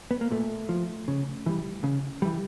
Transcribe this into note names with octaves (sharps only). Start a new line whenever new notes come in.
B3
A#3
A#2 A3
F3
C#3
E3 G3
C#3
E3 G3